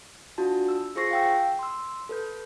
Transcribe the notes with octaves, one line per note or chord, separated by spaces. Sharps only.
D4 F4 F#4 A5
E6
F4 G#4 C5 C#6 A#6 C7
F5 G5 E6
C6 E6
A4 B4 G6